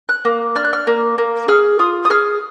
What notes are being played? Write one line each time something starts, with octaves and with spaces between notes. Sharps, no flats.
F#6
A#3
D4 F6
F#6
F6
A#3
A#3
G#4 F6
F4 D#6
D#6
G#4 F6